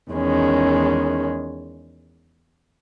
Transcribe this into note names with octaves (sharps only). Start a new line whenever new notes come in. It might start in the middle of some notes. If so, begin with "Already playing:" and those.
E2 D#3 G#3 C#4